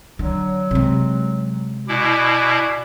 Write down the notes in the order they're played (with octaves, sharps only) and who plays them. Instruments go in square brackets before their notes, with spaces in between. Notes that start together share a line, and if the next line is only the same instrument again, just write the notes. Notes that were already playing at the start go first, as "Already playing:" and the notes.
[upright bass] D3 [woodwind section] F#3
[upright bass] C3 G#3
[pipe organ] B2 E4 [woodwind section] D5 G#5 D6